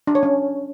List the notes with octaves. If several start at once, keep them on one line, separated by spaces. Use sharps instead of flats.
D4
C#5
C#4